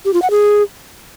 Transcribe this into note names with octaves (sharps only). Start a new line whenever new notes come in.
G4
F4
F#5
G#4